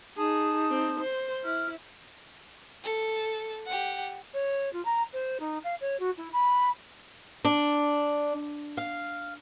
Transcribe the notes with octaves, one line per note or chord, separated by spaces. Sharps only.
D#4 G#4 A5 D#6
C4
C5
E4 F6
A4
G4 F#5
C#5
F4
A#5
C5
D#4
F5
C#5
F#4
E4
B5
D4
F5